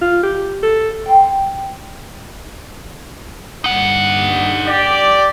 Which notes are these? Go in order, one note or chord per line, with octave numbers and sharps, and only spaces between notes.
F4
G4
A4
G5 C6
G2 D3 G3 D#4 F#5
G4 D5